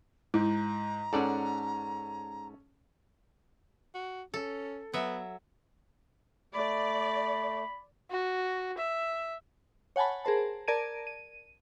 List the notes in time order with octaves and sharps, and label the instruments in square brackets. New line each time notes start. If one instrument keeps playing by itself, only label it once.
[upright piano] G#2 [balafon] E4 [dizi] A#5
[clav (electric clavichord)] G#2 D5 F#5 [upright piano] C#4 A4
[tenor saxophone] F#4
[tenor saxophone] C#4 [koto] A4
[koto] F#3 E5 [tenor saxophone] B3
[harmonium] A3 [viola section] D5 [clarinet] B5
[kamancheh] F#4
E5
[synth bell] C#5 F#5 G#5 A5 B5
G#4 A#4 C5 A5
A#4 D5 A5 G#6 D7 D#7
D#7